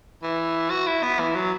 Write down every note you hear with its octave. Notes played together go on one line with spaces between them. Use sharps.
E3
F#4
E4
B3
E3
F#3